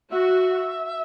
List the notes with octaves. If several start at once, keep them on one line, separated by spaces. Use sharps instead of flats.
F#4 E5